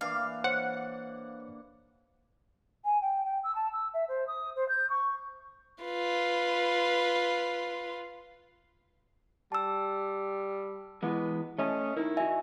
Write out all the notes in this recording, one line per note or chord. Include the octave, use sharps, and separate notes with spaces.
E3 A#3 D4 F5
C5 C#5 F#5
G#5
G5
G5
E6
A5
E6
E5
C5
D#6
C5
G6
C#6
F4 B4
G3 A5 E6
E3 G#3 B3
A3 C#4 D#5
D#4 E4 A#4
F#4 D#5 E5 G#5